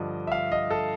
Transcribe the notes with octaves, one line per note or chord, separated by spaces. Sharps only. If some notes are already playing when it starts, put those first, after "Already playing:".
Already playing: G2 D3 F3 D5 D#5
E5
F5
D#5
A4